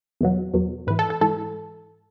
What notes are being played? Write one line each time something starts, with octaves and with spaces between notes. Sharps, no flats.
E2 B2 F#3
E2 B2 F#3
G#2 E3 B4
A4
A4
G#2 E3 A4